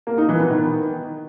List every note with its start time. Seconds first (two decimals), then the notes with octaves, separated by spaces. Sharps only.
0.07 A#3
0.18 D#4
0.29 E3
0.40 B3
0.51 D#3